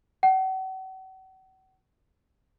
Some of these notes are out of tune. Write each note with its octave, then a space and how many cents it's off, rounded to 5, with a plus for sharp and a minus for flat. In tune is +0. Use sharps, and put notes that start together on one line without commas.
F#5 +40